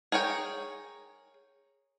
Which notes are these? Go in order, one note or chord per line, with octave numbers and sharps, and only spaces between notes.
G#4 A#4 C#5 G5